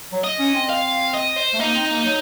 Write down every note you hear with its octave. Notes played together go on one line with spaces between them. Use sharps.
F#3
D#5
C#4
C4
F5
D#5
C5
A3
A#3 D#4
C4
A#3
F#3